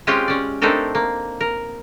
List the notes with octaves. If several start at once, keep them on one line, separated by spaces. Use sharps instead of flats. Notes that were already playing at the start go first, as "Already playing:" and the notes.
G#3 C4 C#4 F4 G4 G5
C#4 D5
A3 C4 D4 D#4 A4 A#4
A#3
A#4